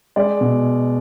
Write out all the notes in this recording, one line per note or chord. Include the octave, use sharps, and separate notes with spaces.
G#3 D5
B2